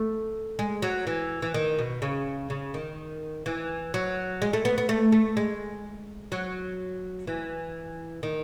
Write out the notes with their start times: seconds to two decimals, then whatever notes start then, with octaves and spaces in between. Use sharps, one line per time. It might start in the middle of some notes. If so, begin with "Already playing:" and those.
Already playing: A3
0.59 G#3
0.82 F#3
1.07 E3
1.42 E3
1.54 D#3
1.79 B2
2.02 C#3
2.50 C#3
2.74 D#3
3.46 E3
3.94 F#3
4.42 G#3
4.53 A3
4.65 B3
4.78 B3
4.89 A3
5.12 A3
5.37 G#3
6.32 F#3
7.27 E3
8.23 D#3